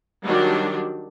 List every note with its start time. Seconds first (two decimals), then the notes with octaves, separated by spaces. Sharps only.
0.24 D#3 F#3 G3 D4